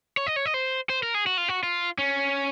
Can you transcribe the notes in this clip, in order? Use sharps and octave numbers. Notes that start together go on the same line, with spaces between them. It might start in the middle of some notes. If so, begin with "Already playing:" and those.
C#5
D#5
C#5
D#5
C5
C5
A#4
G#4
F#4
F4
F#4
F4
C#4